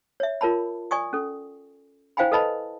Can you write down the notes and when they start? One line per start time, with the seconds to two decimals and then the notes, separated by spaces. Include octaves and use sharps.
0.20 C#5 E5
0.41 F4 A#4 C#5 A5 B5
0.91 D5 G#5 C#6 D#6
1.13 C#4 A4
2.17 E4 C5 F5 G5 G#5 B5
2.32 A4 B4 D#5 A5 B5